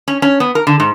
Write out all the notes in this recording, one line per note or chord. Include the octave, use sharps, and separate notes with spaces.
C#4
C#4
B3
A#4
D3
G#2